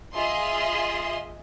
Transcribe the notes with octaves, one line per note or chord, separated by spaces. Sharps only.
F4 G#4 D#5 E5 C6